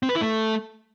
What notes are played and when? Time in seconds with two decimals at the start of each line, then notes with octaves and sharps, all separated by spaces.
0.03 C4
0.09 B4
0.15 E4
0.21 A3